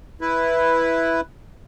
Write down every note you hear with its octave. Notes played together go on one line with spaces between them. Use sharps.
E4 B4